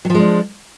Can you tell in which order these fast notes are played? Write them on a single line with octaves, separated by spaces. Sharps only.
F#3 F3 G#3 D4